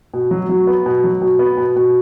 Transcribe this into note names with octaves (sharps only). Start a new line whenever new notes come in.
B2
F#3
F#3
B3
B2
F#3
B2
B3
B2
B2